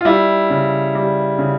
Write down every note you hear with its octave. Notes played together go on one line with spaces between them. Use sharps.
F4
G3 E4
C#3
G3
C#3